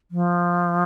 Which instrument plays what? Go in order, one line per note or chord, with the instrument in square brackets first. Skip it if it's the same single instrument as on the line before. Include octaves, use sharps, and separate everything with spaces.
[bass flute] F3